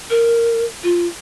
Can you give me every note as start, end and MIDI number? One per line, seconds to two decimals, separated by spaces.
0.10 0.65 70
0.83 1.06 65